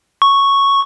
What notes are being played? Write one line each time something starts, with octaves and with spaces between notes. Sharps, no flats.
C#6